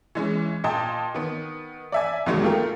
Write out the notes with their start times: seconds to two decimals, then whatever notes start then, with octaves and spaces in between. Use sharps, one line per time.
0.15 E3 G#3 C#4
0.64 A#2 D#5 G5 A5
1.14 D#3 B3
1.92 D5 E5 G#5
2.26 C2 D#3 F#3 G#3
2.44 A3 F4 G4 A#4